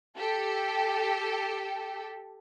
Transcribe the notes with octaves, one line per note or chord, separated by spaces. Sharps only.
G4 A4